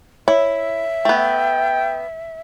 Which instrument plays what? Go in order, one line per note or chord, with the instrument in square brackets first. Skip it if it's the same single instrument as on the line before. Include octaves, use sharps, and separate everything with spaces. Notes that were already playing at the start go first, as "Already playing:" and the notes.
[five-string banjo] E4 [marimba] C#5 [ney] E5
[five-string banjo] A3 B3 [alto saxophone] G5